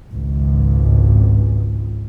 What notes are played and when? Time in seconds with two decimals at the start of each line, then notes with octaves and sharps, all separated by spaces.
0.13 G#1 C#2 G#2